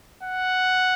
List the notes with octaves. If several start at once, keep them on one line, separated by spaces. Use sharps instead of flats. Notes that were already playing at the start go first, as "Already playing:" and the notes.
F#5